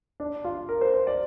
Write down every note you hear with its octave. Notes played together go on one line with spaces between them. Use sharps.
D4
F4
A#4
C5
C5
D5